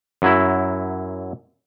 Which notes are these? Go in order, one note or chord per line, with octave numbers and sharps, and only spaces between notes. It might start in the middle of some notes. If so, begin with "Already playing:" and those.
F#2 F#3 E4